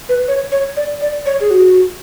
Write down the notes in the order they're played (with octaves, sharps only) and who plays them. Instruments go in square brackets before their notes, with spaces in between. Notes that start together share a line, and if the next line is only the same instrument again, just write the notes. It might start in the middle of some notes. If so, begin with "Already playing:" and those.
[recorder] B4
C#5
C#5
D5
D5
C#5
G#4
F#4